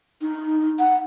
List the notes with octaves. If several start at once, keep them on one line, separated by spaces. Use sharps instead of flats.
D#4
F#5